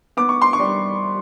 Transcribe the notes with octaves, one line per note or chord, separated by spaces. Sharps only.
B3 D6
C#6
C6
C#6
G3